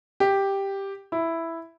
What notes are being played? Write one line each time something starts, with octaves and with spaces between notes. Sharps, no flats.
G4
E4